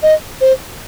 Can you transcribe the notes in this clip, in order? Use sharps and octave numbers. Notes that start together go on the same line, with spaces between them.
D#5
C5